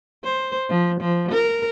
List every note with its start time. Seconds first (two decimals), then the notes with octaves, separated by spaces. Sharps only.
0.24 C5
0.69 F3
1.01 F3
1.32 A#4